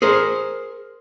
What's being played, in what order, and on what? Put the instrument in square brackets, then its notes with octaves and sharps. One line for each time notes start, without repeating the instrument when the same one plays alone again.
[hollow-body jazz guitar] G#4 A#4 C5